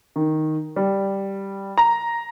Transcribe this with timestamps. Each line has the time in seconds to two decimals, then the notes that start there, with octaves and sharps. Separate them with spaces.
0.16 D#3
0.76 G3
1.78 A#5